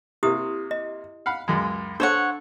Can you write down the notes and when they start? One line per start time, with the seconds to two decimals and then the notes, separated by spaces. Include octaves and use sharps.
0.23 C3 A#3 E4 G4 D#6
0.71 D#5
1.26 F5 F#5 B5
1.48 C#2 F#2 G#3
2.00 D4 A4 C5 C#5 F#5